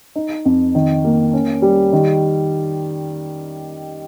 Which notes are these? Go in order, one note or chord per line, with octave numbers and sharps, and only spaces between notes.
D#4
F2
D#3
A#3
C#4
G3
D#3